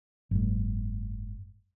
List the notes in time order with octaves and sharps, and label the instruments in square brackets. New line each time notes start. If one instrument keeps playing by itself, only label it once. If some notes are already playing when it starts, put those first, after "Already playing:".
[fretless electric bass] F#1 G#2